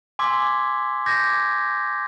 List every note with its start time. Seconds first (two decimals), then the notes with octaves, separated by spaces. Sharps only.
0.19 G#5 C6 D6 E6 G#6 B6
1.06 D6 G6 G#6 A#6 B6